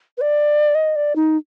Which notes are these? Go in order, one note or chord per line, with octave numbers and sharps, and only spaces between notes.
B4
D5
D#5
D5
D#4